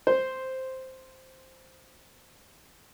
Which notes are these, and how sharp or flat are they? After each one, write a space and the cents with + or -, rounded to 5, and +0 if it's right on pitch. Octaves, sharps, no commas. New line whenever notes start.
C5 +0